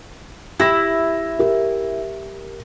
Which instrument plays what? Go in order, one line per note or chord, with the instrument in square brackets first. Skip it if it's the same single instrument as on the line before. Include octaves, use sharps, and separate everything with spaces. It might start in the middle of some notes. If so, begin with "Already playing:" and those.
[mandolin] E4 [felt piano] G4 A#6
[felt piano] G4 A#4